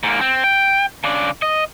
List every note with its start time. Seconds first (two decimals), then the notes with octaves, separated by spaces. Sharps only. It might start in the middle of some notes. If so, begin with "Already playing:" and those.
0.03 G#2 A#3
0.21 C4
0.44 G5
1.04 C#3 D4
1.42 D#5